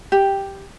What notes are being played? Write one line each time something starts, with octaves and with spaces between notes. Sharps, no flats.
G4